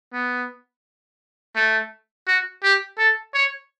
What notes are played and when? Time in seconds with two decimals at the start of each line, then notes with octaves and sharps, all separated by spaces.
0.13 B3
1.56 A3
2.27 F#4
2.63 G4
2.98 A4
3.34 C#5